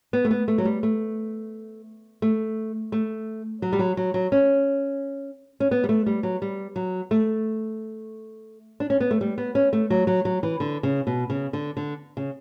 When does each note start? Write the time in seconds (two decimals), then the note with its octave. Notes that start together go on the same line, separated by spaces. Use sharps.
0.13 B3
0.25 A3
0.31 B3
0.48 A3
0.58 F#3
0.65 G3
0.83 A3
2.22 A3
2.92 A3
3.62 F#3
3.73 G3
3.79 F#3
3.97 F#3
4.14 F#3
4.32 C#4
5.60 C#4
5.71 B3
5.84 G3
5.89 A3
6.06 G3
6.23 F#3
6.42 G3
6.76 F#3
7.11 A3
8.80 D4
8.90 C#4
9.00 B3
9.11 A3
9.21 G3
9.38 B3
9.55 C#4
9.73 A3
9.90 F#3
10.07 F#3
10.25 F#3
10.43 E3
10.60 D3
10.83 C#3
11.07 B2
11.30 C#3
11.53 D3
11.77 D3
12.17 C#3